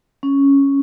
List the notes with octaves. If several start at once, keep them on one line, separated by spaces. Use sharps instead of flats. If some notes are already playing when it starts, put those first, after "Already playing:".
C#4